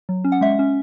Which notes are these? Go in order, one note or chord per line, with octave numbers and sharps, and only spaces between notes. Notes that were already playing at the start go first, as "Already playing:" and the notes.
F#3
C#4
F#5
G#3 E5
C#4